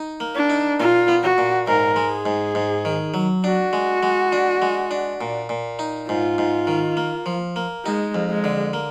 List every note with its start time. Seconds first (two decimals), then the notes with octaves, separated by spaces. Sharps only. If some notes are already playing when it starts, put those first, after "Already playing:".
Already playing: D#4
0.20 A#3
0.35 D4
0.50 D#4
0.79 A#2 F4
1.08 B3
1.23 F#4
1.38 A#2
1.68 G#2 A#4
1.96 G#3
2.11 G#4
2.26 G#2
2.55 G#2
2.85 D#3
3.14 F#3
3.44 D4 F#4
3.73 G#3
4.03 G#3
4.32 D4
4.62 G#3
4.91 D4
5.21 A#2
5.49 A#2
5.79 D#4
6.09 G#2 F4
6.38 G#2
6.67 D#3
6.97 A#3
7.26 F3
7.56 A#3
7.85 G#3 D#4
8.15 F2
8.30 G#3
8.44 D3
8.73 A#3